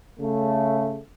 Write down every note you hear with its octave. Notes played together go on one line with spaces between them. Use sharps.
C#3 A3